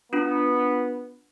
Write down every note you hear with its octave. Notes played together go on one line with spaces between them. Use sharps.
B3 D4 F4